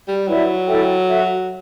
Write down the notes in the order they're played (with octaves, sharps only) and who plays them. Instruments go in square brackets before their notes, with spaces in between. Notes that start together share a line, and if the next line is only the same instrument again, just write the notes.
[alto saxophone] G3
[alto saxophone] F#3 [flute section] E4 B4 D5
[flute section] E4 A4 E5 G5
F#4 A4 E5